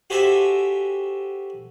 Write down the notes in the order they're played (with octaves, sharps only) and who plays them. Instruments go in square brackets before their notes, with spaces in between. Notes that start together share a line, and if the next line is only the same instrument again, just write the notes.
[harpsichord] F#4 G4 A4 C5 E5 G#5